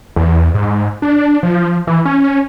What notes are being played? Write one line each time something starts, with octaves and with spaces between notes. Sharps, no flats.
E2
G#2
D4
F3
E3
C#4